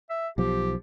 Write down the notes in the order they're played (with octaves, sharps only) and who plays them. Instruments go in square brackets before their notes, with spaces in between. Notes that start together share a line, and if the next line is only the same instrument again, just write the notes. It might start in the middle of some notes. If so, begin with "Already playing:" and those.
[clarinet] E5
[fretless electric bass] B1 F3 [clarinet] G4